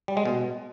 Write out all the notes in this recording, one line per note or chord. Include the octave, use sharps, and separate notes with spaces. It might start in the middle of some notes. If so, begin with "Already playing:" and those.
G3
G#3
B2